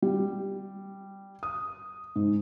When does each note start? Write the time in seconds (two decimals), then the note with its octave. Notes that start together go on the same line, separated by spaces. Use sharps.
0.02 G3
1.43 D#6
2.16 G#2